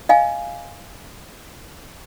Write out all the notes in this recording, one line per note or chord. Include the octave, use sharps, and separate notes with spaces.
D#5 F5 G#5